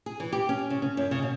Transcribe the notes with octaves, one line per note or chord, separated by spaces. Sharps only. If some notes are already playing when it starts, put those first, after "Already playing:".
G#4
E3
G4
C#4
C#3
C#4
F#2
C#3
B2